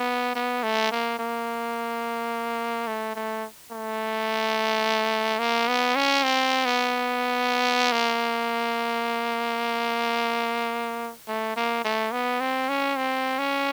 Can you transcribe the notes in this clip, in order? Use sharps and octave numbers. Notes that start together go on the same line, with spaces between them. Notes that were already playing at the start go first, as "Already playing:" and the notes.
Already playing: B3
B3
A3
A#3
A#3
A3
A3
A3
A#3
B3
C#4
C4
B3
A#3
A3
A#3
A3
B3
C4
C#4
C4
C#4